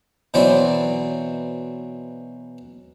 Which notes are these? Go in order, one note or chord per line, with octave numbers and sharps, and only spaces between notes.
B2 E3 F#3 C4 D5